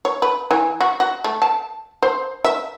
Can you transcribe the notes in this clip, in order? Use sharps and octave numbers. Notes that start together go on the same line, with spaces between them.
C#5
B4
E3
F#4
F#4
A3
A5
C5
E5